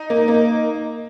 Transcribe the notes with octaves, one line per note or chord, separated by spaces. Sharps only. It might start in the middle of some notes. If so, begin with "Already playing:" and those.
Already playing: D#4
A#3
A#3